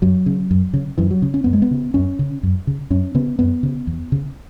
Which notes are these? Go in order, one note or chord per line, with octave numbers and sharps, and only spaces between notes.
F#2 F#3
C#3
F#2
C#3
F#2 E3
F#3
C#3
C#4
F#2 B3
G#3
B3
C#3
F#2 C#4
C#3
F#2
C#3
F#2 C#4
C#3 B3
F#2 B3
C#3
E2
C#3